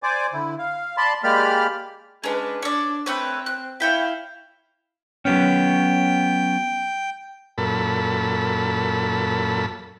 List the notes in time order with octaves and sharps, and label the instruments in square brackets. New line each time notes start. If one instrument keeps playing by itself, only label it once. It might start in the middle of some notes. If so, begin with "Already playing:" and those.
[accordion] C5 D5 G#5 D6
D3 E4
F5
D5 A5 B5 C6
G#3 A#3 G4 D5 B5 F6
[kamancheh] G#3 B4 [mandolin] C#4 D4
[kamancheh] D4 [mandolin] C#5 D5
[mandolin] A3 B4 C#5 [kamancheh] C4
[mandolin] F#6
[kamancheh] E4 F5 [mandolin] C#5 G5 B5
[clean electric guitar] F#3 B3 C#4 [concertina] G5
[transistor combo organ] F#2 A#2 A4 B5